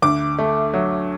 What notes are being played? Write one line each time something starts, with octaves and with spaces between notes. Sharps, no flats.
D2 D6
A3
F#3